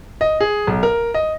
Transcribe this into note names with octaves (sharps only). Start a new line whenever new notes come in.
D#5
G#4
B1
A#4
D#5